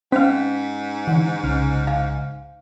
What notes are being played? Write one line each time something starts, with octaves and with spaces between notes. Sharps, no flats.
G#2 C4 C#4 F5 B6
D3 E3 F#5
C2 C#3 F6
F5